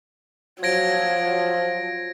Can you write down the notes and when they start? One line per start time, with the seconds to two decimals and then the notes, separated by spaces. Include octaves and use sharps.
0.63 F3 F#3 G#6 A#6 D7